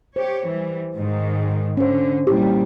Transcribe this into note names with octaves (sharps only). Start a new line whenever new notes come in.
G4 C5 C#5
E3 G3
G#2 D#3 G#3
D3 C#4 C5
A#2 G3 E4 G4